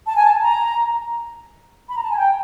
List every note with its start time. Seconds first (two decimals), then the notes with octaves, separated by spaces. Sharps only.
0.07 A5
0.16 G#5
0.24 A5
0.42 A#5
1.89 B5
1.97 A#5
2.04 A5
2.11 G#5
2.18 G5